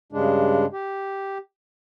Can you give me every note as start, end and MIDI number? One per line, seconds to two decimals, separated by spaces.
0.12 0.65 43
0.12 0.65 49
0.12 0.65 56
0.12 0.65 62
0.73 1.38 67